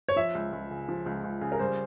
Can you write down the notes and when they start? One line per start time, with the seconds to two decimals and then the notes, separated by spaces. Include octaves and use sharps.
0.08 C#5
0.16 F3 E5
0.35 C#2
0.52 C#2
0.71 C#3
0.88 F3
1.06 C#2
1.24 C#2
1.41 C#3
1.52 A#4
1.59 G3 C5